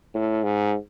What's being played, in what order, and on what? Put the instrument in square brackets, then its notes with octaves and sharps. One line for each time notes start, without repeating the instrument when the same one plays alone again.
[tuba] A2
G#2